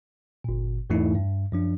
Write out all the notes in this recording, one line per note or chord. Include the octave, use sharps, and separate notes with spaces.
G1 A#2
E2 G#2 E3 A3 D#4 E4
G2
F#2 F3 D4